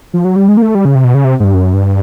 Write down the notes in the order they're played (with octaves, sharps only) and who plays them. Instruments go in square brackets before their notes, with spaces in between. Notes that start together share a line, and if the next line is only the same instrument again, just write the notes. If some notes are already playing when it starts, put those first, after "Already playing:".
[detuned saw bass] F3
F#3
G3
G#3
A#3
A3
G3
C#3
C3
B2
C#3
C3
G#2
G2
F#2
G2